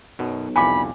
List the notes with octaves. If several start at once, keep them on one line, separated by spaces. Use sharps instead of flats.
B1 F#2 B2
C2 F2 A#2 G#5 B5 D6